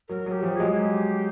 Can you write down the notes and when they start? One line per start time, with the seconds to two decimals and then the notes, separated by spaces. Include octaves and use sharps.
0.09 F#3 A#4
0.26 F#3
0.32 G4
0.43 F3 G3
0.54 G#4
0.60 F#3 G#3
0.77 G4